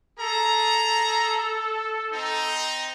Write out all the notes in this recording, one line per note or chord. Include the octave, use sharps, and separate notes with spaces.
G#4 A4 A#5
C4 D#4